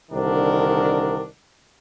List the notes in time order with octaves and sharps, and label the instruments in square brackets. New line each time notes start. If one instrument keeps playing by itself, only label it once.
[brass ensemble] C2 D3 D#3 D4 A#4